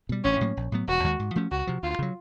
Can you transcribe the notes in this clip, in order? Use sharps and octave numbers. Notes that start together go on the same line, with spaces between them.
B2 G3
A1 C#4
A2 F#3 A#3
A#1
A2 F#3 B3
E1 F#4
D#2 D#3 G#3
G#2
F3 A3 C#4
C#2 F#4
C3 F3
D2 F4
C#3 F#3